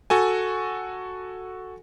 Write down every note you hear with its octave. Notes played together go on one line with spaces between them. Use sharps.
F#4 A4 G#5